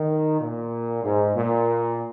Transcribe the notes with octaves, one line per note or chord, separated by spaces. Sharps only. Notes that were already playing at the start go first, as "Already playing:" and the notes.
Already playing: D#3
A#2
G#2
A#2